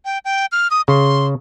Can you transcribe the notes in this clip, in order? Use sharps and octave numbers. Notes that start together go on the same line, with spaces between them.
G5
G5
F6
D#6
C#3 C6